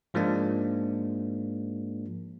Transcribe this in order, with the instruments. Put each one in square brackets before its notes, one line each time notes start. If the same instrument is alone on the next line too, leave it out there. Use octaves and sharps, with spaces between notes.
[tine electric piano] G#2 F3 G#3 A#3 D4